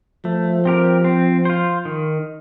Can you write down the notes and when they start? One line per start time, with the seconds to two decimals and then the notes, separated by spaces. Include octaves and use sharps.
0.25 F3 A3
0.65 C4 G4 A#4
1.05 C4
1.45 F4 C5
1.85 D#3